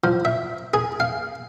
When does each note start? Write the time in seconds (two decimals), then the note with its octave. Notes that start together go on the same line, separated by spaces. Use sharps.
0.04 F3
0.25 E5
0.74 G#4
1.00 F5